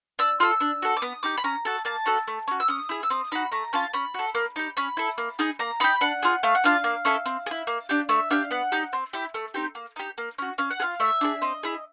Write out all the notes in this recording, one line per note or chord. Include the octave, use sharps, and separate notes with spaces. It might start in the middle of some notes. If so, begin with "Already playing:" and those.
D4 E6
F4 A4 E6
D4
F#4 A4
D6
B3 D#6
D#4 G4 D6
B5
C#4 A#5
F#4 A4 A5
A#3 A5
C#4 F#4 A4
A3
C#4 F#4
E6
C#4 D#6
E4 G#4
E6
C4 D#6
D#4 F#4 B5
A3 A#5
C#4 F4 A5
C#4 B5
F#4 A4
A#3
D#4 G4
C#4 B5
E4 A4
A#3
D#4 G#4
A#3 A#5
D#4 G4 B5
D4 F#5
F4 G#4
A3 F5
F#5
D4 F4 F5
A#3
C#4 E4 A4
C4
G#4
E4
A#3
D4 G4
A3 E5
D4 G4 F5
B3 F#5
D#4 G4
C4
E4 G4
A3
C4 D#4 G4
A#3
D#4 G4
A#3
C#4 F#4
C#4 F5
F#5
F4 G#4 F5
A3 E5
D4 F4 G#4
C4 D#5
E4 G#4